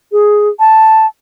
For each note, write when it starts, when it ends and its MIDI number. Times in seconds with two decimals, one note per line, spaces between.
0.12 0.49 68
0.59 1.06 81